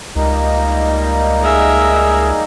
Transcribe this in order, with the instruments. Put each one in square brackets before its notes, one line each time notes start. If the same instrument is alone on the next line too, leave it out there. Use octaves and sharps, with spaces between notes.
[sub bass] C#2 [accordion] G3 A#3 D#4
[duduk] G#4 [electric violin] A#4 E5